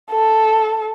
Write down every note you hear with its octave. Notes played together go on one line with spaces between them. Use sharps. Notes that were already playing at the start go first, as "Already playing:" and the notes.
A4